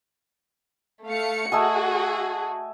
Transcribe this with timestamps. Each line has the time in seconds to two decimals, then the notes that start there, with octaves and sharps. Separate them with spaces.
1.06 A3 F5 C#7
1.52 A3 F#4 G#4 D#5 G#5